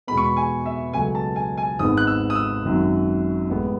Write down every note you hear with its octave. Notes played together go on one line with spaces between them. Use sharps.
E2 B2 G#3 B3 B5
C#6
B5
G#5
E5
C#2 B2 F#3 A3 G#5
A5
G#5
G#5
G#1 G#2 D#3 G#3 B3 D#6
F#6
E6
D#6
E6
G#1 F#2 D#3 F#3
A1 A2 G#3 B3